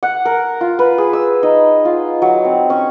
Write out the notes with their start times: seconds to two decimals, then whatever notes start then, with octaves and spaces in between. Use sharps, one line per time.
0.03 F#5
0.25 A#4
0.61 F4
0.79 B4
0.98 G#4
1.13 E6
1.43 D#4
1.85 F4
2.22 F#3
2.45 C4
2.70 C#4